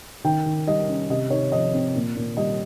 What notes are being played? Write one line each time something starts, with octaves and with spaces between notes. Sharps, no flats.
D#3 G5
D#3
G3 D#5
C#4
C3 D#5
D#4 C#5
F3 D#5
C4
A#2
A#2
G3 D#5